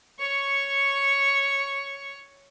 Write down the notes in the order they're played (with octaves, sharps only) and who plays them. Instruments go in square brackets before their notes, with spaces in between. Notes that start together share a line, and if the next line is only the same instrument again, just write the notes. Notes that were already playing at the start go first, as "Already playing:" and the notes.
[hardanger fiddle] C#5 C#6